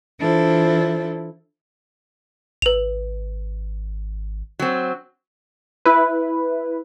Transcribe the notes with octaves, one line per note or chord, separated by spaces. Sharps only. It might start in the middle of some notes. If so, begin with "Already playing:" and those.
E3 D4 E4 F4 A4 C5
G#1 B4 F7
F#3 C4
E4 B4